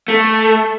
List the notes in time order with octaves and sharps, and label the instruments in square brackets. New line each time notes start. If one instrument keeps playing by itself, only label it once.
[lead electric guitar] A3